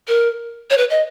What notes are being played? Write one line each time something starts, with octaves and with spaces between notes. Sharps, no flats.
A#4
C#5
B4
D#5